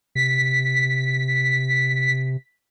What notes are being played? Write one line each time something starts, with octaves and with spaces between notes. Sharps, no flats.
C3 B6